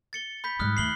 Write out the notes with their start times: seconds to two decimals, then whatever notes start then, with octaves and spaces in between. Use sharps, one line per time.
0.13 A6 C#7 G7
0.44 B5 G6 B6
0.59 G#2 G3 D#6 F6 F#6
0.77 D#2 A3 C7 F#7 G7